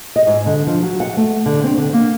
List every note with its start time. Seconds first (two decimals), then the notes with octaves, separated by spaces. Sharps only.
0.16 D#5
0.27 G#2
0.46 D3
0.67 F3
0.82 F#3
1.00 F#5
1.17 A3
1.46 D3
1.64 C4
1.78 D3
1.93 A#3